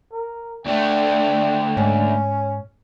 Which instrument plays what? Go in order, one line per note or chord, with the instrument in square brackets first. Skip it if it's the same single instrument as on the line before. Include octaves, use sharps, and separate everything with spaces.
[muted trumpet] A#4
[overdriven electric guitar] D2 A3 [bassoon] D4 [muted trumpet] G5
[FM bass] G#2 [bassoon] C#4